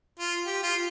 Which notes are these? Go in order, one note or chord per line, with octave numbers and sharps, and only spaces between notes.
F4
G4
F4